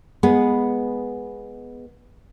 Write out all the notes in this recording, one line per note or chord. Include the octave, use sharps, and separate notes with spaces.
G#3 B3 G#4